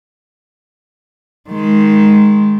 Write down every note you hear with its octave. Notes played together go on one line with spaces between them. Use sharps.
D#3 G#3